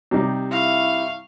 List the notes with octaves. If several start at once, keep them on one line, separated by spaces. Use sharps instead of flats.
C3 G3 D#4
E4 F5 C#6